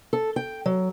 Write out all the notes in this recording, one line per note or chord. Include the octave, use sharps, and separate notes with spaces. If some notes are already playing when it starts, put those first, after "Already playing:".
A4
G5
F#3